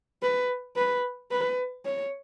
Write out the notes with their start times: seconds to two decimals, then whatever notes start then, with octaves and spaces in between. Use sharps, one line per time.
0.23 B4
0.76 B4
1.31 B4
1.85 C#5